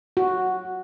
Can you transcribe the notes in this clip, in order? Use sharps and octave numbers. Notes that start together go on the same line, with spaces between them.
F#4